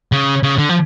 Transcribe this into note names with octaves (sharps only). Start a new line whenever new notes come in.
C#3
C#3
D3
F3